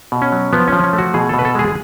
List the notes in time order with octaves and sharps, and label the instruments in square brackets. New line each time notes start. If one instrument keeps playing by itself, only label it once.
[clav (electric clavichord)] B2
C#4
F#3
F3 B3
F3 C#4
C#4
A3
F#4
B2 G#4
B2 A4
B4
A4
G#3 G#4
G#4